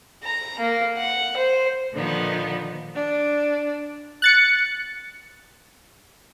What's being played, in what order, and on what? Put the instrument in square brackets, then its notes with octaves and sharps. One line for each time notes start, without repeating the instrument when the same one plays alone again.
[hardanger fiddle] A#5
A#3
F#5
C5
[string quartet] A#2 D3 D#3 F3 B3 D#4
[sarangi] D4
[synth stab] F#6 A6 C#7